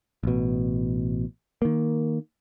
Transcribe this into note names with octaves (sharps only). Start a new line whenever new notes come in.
A1 B2
D#3 A#3